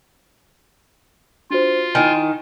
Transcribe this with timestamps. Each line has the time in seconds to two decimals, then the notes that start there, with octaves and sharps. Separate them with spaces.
1.50 D4 F4 F#4 C5
1.95 D#3 E4 D#5 G#5